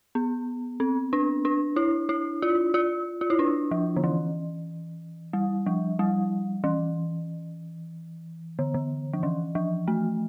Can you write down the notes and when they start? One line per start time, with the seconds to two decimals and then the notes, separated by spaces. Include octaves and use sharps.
0.15 B3
0.80 C4
1.13 D4
1.45 D4
1.76 E4
2.09 E4
2.42 F4
2.74 F4
3.21 F4
3.30 E4
3.39 D4
3.71 F3
3.96 D3
4.04 E3
5.33 G3
5.66 F3
5.99 G3
6.64 E3
8.59 D3
8.74 D3
9.13 F3
9.23 E3
9.55 F3
9.88 A3